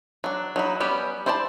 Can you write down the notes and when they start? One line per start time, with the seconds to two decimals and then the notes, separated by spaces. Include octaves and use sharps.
0.24 F#3 D4
0.56 F#3 D#4 E4
0.80 G3 B3 C#4 G4
1.26 E4 C5 D5 G5 A5